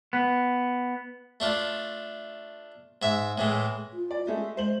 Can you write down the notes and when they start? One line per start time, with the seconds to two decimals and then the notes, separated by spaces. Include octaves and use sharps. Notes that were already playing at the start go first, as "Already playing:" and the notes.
0.13 B3
1.40 A3 D4 F4
3.02 G#2 E5
3.38 A2 E3 G#3
3.93 F4
4.11 D5
4.27 G#3 A3 E5
4.57 G#3 C5 F#7